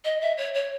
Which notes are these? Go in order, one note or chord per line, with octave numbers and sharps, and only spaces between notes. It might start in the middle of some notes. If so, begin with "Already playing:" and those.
D#5
E5
C#5
C#5